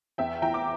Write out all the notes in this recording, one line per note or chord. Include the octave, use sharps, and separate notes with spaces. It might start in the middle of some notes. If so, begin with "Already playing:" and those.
E2 E5 G5
E3 G5 A#5
D6